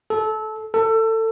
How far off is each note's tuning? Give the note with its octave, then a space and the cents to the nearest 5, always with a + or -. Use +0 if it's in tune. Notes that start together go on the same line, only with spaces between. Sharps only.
A4 -20
A4 +25